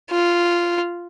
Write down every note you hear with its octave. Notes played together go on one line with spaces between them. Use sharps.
F4